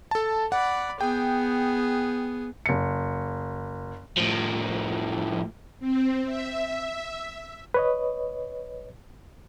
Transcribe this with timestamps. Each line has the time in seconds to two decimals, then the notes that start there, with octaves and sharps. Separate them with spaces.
0.11 A4 A5
0.52 D5 F#5 B5
1.01 B3 G#4 G5
2.66 F#1 C#7
4.17 A2 F3
5.79 C4
6.25 E5
7.74 B4 C#5 D#5